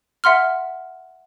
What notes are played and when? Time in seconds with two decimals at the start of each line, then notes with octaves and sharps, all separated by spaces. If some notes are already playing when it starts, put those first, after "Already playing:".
0.24 E5 F#5 C6 F6